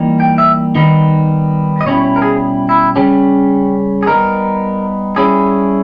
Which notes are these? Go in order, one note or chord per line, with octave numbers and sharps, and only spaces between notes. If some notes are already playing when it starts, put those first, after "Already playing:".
Already playing: E3 G3 A#3 D#4
G5
E5
D#3 G3 B3 D#4
D#5
B2 G3 C#4 E4 C#5
A#4
G#4
E4
C#3 G3 C#4 G4
G#4
G3 B3 D#4 A#4
G3 C#4 E4 G#4